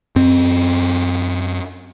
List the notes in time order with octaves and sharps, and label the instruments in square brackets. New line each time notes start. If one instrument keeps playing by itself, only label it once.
[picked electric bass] F#2 C4